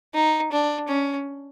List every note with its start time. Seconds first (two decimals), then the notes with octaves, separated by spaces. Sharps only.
0.14 D#4
0.52 D4
0.88 C#4